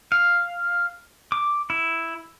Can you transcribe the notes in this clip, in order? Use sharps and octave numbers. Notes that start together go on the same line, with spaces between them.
F5
D6
E4